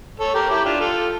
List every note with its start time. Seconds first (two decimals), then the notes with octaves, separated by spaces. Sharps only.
0.20 A4 C#5
0.35 G4 A#4
0.50 E4 G4
0.65 D4 F4
0.80 F4 A4